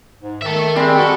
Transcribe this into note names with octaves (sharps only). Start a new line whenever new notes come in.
G#2
D#3 A4 E5
G3 G#3 C4
F#4 A4